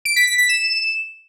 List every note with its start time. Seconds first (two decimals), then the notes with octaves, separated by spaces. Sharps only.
0.05 D7
0.16 B6
0.27 B6
0.38 B6
0.49 E7